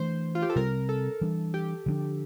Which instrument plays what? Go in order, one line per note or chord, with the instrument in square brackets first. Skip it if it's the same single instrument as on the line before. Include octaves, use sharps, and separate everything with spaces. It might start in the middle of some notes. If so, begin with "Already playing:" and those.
Already playing: [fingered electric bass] E3 A3 D4 [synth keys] C5
[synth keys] F4
G4
A4
[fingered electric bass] C3 G3 C4 [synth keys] A#4
[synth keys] A4
[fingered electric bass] E3 G3 D4
[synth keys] G4
[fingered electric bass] D3 F3 A#3 D4